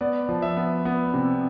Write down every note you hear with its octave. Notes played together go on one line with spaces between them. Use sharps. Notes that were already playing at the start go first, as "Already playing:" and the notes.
B3 D5
F3
E5
B3
B3
C3